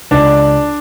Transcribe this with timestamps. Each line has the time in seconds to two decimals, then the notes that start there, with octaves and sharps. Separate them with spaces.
0.11 C#2 D4 D5